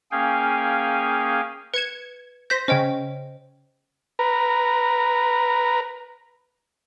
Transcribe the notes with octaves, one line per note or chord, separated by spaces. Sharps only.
A#3 C#4 G#4 F5 G5 G#5
B4 G#6 C#7 E7
C5 G6 A#6 B6
C#3 C#4 C5 D#5 G5
B4 A#5